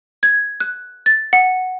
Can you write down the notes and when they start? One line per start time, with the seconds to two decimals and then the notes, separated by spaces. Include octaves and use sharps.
0.23 G#6
0.60 F#6
1.06 A6
1.33 F#5